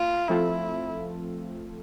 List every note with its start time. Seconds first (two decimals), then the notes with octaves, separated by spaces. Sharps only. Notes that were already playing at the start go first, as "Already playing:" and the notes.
Already playing: A#3 F4
0.28 F3 A3 C4 E4 F4 A4